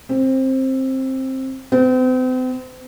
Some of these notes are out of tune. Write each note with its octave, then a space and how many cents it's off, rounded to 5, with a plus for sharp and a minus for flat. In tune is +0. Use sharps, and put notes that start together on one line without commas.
C4 +15
C4 -40